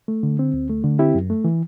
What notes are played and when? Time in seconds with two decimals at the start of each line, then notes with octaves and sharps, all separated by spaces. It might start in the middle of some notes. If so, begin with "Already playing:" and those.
0.08 A3
0.23 D3
0.39 C4
0.53 D2
0.70 A3
0.84 D3
0.99 C4 E4 G4
1.15 F#2
1.30 A3
1.44 E3